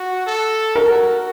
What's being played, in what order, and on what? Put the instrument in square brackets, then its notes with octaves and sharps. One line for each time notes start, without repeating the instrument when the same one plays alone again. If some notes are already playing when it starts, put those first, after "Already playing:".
Already playing: [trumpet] F#4
A4
[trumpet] F#4 [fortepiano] A#4